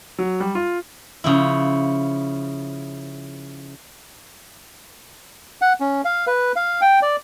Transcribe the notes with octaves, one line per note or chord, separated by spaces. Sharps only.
F#3
G3
F4
C#3 F3 E4
F#5
C#4
F5
B4
F5
G5
D5